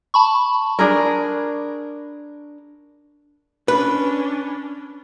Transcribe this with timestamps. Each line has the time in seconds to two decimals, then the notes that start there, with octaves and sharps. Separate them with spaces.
0.14 A5 B5 C#6
0.79 D4 G#4 A#4
3.68 C#4 D4 B4